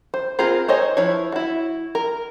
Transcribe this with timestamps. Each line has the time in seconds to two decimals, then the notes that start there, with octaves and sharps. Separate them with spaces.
0.14 C5
0.39 C4 F4 G#4 A#4 C5
0.68 D#4 C5 C#5 D#5 G#5
0.97 F3 E4 B4 C#5
1.32 E4 F#4
1.95 A#4